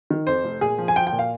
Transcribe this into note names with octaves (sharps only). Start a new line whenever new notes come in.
D#3
F2 C5
F1
A#2 G#4
F3
G#5
F3 G5
G5
A#2
F5